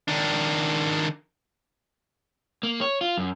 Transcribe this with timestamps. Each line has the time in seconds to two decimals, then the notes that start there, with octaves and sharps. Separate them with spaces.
0.08 D#3 D4
2.63 A#3
2.81 C#5
3.01 F4
3.17 F#2